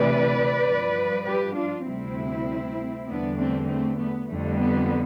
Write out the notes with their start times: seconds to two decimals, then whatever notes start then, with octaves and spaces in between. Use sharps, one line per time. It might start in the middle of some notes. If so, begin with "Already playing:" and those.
Already playing: D2 C3 E3 B4 D5
0.64 G2 F3
1.25 G4 B4
1.55 D4 F4
1.86 D2 C3 G3 C4 E4
3.08 E2 D3 G3 B3 D4
3.38 A3 C4
3.68 A3 C4
3.99 B3
4.29 F2 D3 G3 A3
4.60 B3